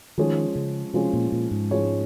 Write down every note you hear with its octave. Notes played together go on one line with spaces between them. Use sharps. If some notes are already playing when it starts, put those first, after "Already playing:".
D#3 F3 G#3 C#4 G#4 C#5
C#3
C3 F3 G#3 C#4 G#4 C#5
A#2
A#2
G#2
F3 G#3 C#4 G#4 C#5